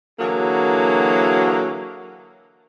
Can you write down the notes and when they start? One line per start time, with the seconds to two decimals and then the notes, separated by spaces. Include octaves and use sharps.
0.20 D3 E3 F#3 A#3 F#4 G#4